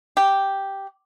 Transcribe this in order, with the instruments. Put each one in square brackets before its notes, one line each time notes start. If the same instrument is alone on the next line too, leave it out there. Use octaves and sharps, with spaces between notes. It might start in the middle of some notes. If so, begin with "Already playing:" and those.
[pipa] G4